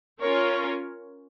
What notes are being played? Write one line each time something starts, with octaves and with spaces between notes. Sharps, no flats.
C#4 F4 A#4 C#5